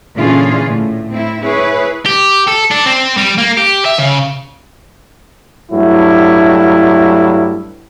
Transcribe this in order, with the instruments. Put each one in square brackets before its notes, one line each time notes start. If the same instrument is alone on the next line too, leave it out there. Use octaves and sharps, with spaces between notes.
[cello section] A#2 D3 E3 C#4 F4 G#4
A2
C4 E4
E4 G#4 B4 C#5
[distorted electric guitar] G4
A4
D4
C4
G3
A#3
G4
E5
C#3
[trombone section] G2 F#3 A3 E4